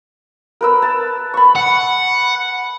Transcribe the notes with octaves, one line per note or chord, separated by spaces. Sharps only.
A#4 B4 E6
A5
B5 C#6
F#5